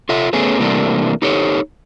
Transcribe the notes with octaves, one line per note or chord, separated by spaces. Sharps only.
F4 A4 E5
A3 B3 C#4 G#4
C3 E3 G3 A3 A#3 D4
D#4 G4 A4 C#5